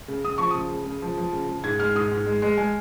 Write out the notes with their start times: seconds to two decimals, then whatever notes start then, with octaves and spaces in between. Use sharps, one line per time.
0.08 C#3
0.24 C#3 D#6
0.38 F3 C#6
0.51 C#3 D#6
0.71 C#3
0.86 C#3
1.02 F3
1.17 F3
1.33 C#3
1.49 C#3
1.64 G#2 G#6
1.80 G#3 F6
1.95 G#2 D#6
2.12 G#2
2.26 G#3
2.42 G#3
2.58 G#3 G#5